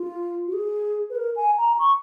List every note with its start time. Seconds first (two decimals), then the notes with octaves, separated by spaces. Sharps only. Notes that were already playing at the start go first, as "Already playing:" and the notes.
Already playing: F4
0.47 F#4
0.53 G#4
1.10 B4
1.16 A#4
1.36 G#5
1.58 A#5
1.79 C#6